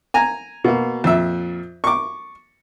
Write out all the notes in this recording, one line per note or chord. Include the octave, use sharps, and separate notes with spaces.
G#5 A#5
B2 A#3
F2 A#2 E5
C#6 D6